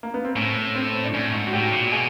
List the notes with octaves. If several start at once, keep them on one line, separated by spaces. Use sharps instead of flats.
A#3
B3
C4
A2 C#4
C4
D4
A2 C#4
G#2
F#4
A2 G4
A#2
B2 G#4